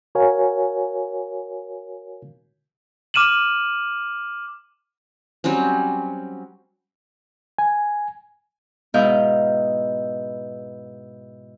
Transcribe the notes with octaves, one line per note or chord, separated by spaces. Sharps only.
F#4 A#4 C#5 F5 G#5
D6 F6 D#7 E7 F#7
F#3 G3 C4 C#4
G#5
G#2 B2 E4 D#5 F5 G6